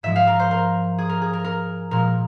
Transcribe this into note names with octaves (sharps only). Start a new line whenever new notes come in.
G#2 F3 G#3 E5
F5
A#4
C5
A#4
G#4
A#4
G#4
A#4
A#4
A#2 F3 G#3 A#4